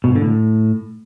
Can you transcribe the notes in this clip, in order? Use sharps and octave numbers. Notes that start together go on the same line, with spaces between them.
B2
G#2
D3
A2